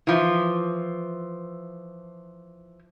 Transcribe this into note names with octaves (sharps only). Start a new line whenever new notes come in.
E3 F3